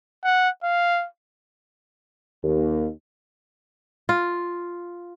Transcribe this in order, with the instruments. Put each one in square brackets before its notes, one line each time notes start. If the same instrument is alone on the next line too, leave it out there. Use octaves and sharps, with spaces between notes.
[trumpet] F#5
F5
[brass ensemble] D#2
[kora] F4